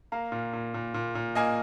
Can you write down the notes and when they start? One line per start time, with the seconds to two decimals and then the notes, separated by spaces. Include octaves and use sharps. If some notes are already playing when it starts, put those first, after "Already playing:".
0.12 A#3 F5 A#5
0.32 A#2
0.53 A#2
0.74 A#2
0.94 A#2
1.15 A#2
1.35 A#3 D#5 G#5